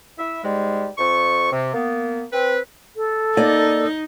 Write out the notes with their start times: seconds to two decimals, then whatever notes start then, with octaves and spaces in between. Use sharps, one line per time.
0.18 E4 E5
0.44 G#2 G3 G#3
0.98 F2 C#6
1.52 C3
1.74 A#3 B3
2.33 C4 B4
2.96 A4
3.37 A#3 D#4 D5 D#5